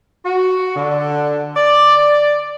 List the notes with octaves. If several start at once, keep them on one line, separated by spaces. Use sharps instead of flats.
F#4
D3
D5